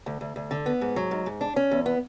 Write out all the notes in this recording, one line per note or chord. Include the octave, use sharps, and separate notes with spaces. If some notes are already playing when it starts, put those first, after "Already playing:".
D2
D2
D2
D3
B3
G#2
F#3
G#2
G#2
D4
C#4
E2
B3